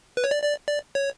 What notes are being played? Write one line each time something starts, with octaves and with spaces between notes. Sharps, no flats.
B4
C#5
D5
D5
D5
C#5